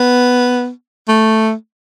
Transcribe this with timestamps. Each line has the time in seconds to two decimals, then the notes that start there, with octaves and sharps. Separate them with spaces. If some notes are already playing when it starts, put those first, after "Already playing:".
Already playing: B3
1.08 A3